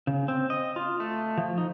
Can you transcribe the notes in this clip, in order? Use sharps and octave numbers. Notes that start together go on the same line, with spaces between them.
C#3
C4
D#5
F4
A3
F3
D#4